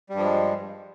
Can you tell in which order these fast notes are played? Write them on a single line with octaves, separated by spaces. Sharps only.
G3 G2 F3 G#3